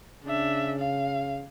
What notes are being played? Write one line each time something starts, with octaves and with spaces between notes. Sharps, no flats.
C#3 D4 E5
F5